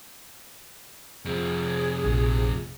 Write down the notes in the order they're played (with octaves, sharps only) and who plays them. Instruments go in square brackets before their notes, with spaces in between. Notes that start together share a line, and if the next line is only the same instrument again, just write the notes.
[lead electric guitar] F2 C3 [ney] G#4
[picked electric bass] A#1